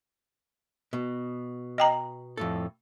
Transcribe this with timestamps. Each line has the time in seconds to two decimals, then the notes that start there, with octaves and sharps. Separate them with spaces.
0.93 B2
1.78 D#5 G5 A#5
2.37 F2 A2 A4